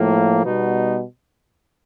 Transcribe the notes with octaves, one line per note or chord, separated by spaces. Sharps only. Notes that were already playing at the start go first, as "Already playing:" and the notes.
Already playing: A2 F3 A#3
B2 G3 B3 D#4 F#4